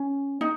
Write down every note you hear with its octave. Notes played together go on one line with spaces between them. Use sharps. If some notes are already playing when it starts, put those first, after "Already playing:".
Already playing: C#4
D#4